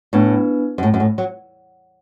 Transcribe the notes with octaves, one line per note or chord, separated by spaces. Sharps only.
A2 B3 D4 B4
F#2
A2
F#2
A2
F#3